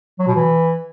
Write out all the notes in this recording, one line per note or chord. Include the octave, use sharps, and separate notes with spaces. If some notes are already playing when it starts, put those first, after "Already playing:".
F#3
B2
E3